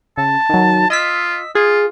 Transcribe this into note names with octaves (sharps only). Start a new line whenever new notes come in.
C#3 A5
D#3 F#3
F4 D#5 E6 B6
F4 G#4